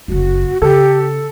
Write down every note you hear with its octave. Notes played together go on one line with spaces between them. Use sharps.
F#1 F#2 F#4
C#3 G4 A4